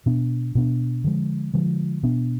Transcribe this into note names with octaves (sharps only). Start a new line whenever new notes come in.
B2 B3 D4
B2 B3 D4
D3 F3 G#3
D3 F3 G#3
B2 B3 D4